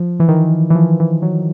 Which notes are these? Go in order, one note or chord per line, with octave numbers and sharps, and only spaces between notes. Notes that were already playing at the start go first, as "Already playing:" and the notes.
Already playing: F3
E3
D#3
E3
F3
E3
F#3